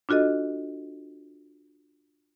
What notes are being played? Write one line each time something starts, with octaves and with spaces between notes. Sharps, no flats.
D4 F4 F#4 A4 D#5